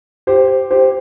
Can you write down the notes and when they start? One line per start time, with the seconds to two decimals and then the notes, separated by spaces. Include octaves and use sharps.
0.27 G4 C5
0.71 G4 C5